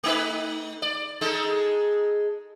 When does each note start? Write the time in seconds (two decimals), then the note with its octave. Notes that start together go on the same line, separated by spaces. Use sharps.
0.04 A3 D#4 B4
0.82 D5
1.21 G#3 D#4 A4